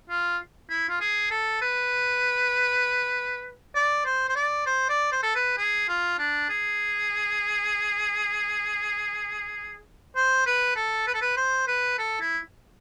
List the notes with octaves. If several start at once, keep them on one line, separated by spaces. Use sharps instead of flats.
F4
E4
F4
G#4
A4
B4
D5
C5
C5
D5
C5
D5
C5
A4
B4
G#4
F4
D4
G#4
C5
B4
A4
B4
A4
B4
C5
B4
A4
E4